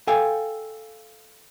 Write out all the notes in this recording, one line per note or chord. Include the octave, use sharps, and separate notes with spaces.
A4 F5 G5 G#5